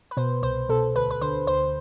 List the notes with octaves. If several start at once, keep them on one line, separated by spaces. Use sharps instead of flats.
B4
B2 C5
C2 C5
B2 A4
D2 B4
B4
D3 C5
D2 C5